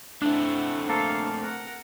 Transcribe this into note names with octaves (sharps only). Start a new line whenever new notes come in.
A3 C4 D4 E4 F#5
A#3 A4 C5 F5
A#4 F#5